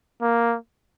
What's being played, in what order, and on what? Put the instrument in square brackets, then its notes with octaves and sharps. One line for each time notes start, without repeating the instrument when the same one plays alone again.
[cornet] A#3